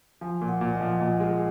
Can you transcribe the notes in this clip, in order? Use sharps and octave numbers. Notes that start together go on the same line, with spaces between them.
F3 G#5
A#2
F#5
A#2
D#5
F3
A#2
G#3